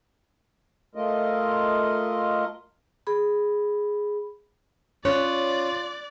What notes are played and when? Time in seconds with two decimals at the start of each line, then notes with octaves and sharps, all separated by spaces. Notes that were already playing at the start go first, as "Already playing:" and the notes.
0.95 A3 F4 A#4 D#5
3.07 G#4 B5
5.05 C#4 F4 C#5 D5 F#6